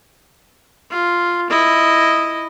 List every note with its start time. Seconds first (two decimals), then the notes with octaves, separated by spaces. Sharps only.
0.90 F4
1.50 E4 D#5